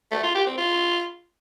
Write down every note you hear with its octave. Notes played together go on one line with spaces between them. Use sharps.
A3
F4
G4
C4
F4